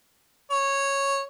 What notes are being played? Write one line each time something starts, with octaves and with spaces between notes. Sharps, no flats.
C#5